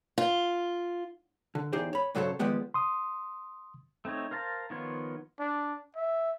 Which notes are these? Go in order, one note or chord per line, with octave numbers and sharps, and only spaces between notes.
F4
D3
E2 D#4 G4 G#4 C5
C#5 B5
G2 C#3 F#3 A4 C5 C#5
D#3 F3 G3 G#3 B3 G4
C6 D#6
A3 C4 D#4 C#5
A#4 C5 F5 A5 A#5
D#3 F3 B3 F4 C#5
D4
E5